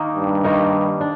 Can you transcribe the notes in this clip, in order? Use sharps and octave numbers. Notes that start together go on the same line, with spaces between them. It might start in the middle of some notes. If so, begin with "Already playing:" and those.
Already playing: D#3 A#3 D#4
G2
D#3 A#3 D#4 A#4
D4